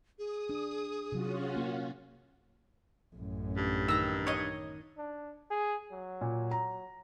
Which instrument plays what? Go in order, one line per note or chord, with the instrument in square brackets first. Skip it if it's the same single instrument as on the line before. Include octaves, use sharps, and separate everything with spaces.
[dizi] G#4 [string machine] D#6
[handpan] D4
[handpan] C3 F#3 [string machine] C#4 F4 F#4
[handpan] A#3
[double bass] A1 F#2
[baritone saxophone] G2
[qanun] D#3 A#5 [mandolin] E6
[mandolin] C#5 D#5
[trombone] D4
G#4
F#3
[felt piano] A#2
A#5